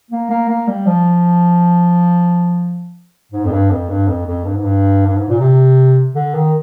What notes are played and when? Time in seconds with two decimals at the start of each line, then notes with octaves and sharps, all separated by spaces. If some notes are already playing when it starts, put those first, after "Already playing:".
0.11 A#3
0.30 A#3
0.49 A#3
0.67 G3
0.86 F3
3.32 G#2
3.45 F2
3.52 G2
3.71 F2
3.89 G2
4.08 F2
4.26 F2
4.45 G2
4.55 G#2
4.63 G2
5.07 G2
5.17 G#2
5.29 A#2
5.40 C3
6.15 D3
6.35 D#3